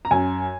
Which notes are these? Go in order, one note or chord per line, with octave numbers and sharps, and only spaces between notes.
A#5
F#2 G#5